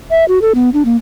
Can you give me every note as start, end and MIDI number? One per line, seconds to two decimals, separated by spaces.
0.11 0.25 76
0.28 0.39 66
0.42 0.53 69
0.55 0.70 59
0.74 0.83 62
0.85 0.96 58